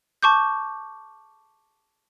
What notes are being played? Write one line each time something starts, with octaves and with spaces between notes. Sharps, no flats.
A5 C#6 D6 G6